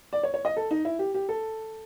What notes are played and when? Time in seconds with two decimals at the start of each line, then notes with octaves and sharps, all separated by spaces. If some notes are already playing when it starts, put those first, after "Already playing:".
0.13 D5
0.23 C#5
0.34 C#5
0.45 D#5
0.57 A4
0.71 D#4
0.85 E4
0.99 G4
1.14 G4
1.29 A4